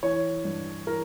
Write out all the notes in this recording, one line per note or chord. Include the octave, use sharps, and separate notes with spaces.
E3 C#5
G2
E3 A#4